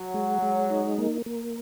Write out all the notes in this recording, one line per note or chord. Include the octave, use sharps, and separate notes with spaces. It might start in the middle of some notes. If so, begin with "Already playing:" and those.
Already playing: F#3
G#3
G#3
D#4
A#3
A#3